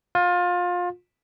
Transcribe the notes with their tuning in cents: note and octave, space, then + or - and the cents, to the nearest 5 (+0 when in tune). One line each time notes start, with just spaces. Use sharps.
F4 +25